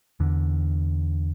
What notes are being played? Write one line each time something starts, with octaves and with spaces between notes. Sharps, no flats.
E2 D3